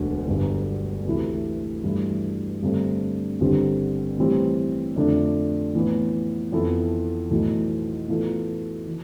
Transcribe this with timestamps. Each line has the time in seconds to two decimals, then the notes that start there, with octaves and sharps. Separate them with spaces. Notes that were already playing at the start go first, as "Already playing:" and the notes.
Already playing: E1 D2 D3
0.28 G1 G2 D3
1.05 D2 C3 E3 A3 E4
1.84 G2 E3 A3 E4
2.62 G2 D3 A3 C4
3.40 G1 G2 D3 G3 C4
4.18 A2 E3 G3 C4
4.96 F2 D3 A3 D4
5.75 A2 E3 B3
6.52 F2 E3 B3 E4 A4
7.30 B1 A2 E3 A3
8.08 A2 E3 B3 F4 A4
8.87 E3